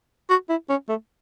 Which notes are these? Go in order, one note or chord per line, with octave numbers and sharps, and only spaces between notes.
F#4
E4
C#4
A3